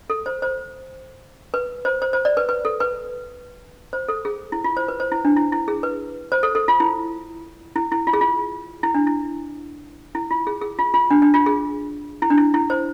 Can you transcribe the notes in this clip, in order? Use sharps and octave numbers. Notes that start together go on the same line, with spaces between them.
A4
C5
C5
B4
C5
C5
C5
D5
B4
B4
A4
B4
C5
A4
G#4
E4
F4
C5
B4
C5
E4
D4
E4
E4
G#4
B4
C5
A4
A4
F4
E4
E4
E4
F4
G#4
F4
E4
D4
E4
E4
F4
G#4
G#4
F4
F4
D4
D4
F4
G#4
E4
D4
E4
E4
C5